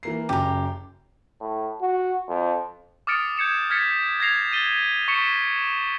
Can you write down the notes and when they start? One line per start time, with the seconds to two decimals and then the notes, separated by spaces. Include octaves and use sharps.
0.03 E3 A#3 C7
0.29 F#1 F#2 G4 A#5
1.40 A2
1.81 F#4
2.28 F2
3.07 D6 D#6 F6 A6 C#7 D7
3.37 G6 G#6 C#7 E7
3.70 F6 G#6 A6 B6 C#7
4.20 G#6 A#6 C7 F7
4.51 A6 C7 D#7 E7 G7
5.08 C#6 B6 C#7 E7